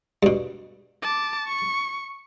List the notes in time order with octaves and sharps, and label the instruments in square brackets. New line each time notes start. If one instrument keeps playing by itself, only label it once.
[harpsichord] G2 B2
[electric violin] A5 D6
C#6